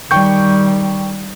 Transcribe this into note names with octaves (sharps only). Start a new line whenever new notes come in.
D#3 G3 G5 C#6 G6